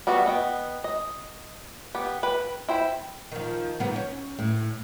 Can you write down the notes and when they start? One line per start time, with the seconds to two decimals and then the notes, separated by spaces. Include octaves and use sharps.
0.07 G3 B3 C4 F#4
0.26 B3 D#5 G5
0.84 D#5
1.95 B3 G4
2.23 B4 G5
2.69 E4 C5 G5 B5
3.32 D#3 F3
3.80 G#2 F3 B3
3.96 C#4
4.39 A2